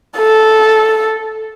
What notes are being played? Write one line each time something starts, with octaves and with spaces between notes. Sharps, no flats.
A4